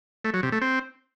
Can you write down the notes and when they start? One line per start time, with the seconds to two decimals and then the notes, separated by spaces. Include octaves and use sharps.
0.25 A3
0.34 F#3
0.43 C3
0.52 A3
0.62 C4